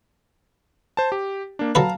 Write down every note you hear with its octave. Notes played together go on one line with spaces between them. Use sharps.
C5 A5
G4
A#3 D4
F#3 A4 B4 F5 A5 A#5